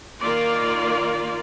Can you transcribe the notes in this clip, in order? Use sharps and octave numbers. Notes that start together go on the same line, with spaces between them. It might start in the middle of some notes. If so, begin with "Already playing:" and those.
D#3 A#3 F4 D5